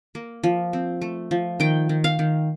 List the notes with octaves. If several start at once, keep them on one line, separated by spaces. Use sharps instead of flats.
A#3
F3
C4
A3
F3
D#3 G5
D#3
F5
D#3